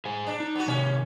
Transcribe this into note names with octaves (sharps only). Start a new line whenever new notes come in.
G#4 C5 G#5
D4
D#4
B3 F#4
C3 D#3 C#4